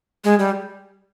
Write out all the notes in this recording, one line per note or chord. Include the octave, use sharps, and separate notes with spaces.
G#3
G3